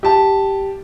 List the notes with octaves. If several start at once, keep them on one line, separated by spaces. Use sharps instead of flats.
G4 A5